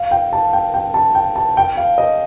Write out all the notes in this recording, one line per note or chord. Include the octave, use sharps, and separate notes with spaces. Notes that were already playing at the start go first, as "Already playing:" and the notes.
Already playing: F5
G5
A5
G5
G5
A5
G5
A5
G5
F5
D#5